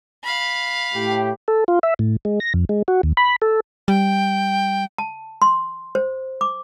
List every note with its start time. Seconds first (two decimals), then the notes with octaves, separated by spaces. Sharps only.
0.24 F5 B5
0.94 A2 G4
1.48 A4
1.68 F4
1.83 E5
1.99 A2
2.25 G#3
2.40 A#6
2.54 F2
2.69 G#3
2.88 F#4
3.03 D#2
3.17 B5
3.42 A4
3.88 G3 G5
4.98 A5
5.42 C6
5.95 C5
6.41 D6